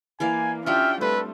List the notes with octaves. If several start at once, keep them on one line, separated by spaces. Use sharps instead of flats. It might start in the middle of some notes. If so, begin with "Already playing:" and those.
E3 A#3 D5 F5 G#5
C#4 D4 F4 G4 E5 G5 F6
G3 A3 C4 A4 B4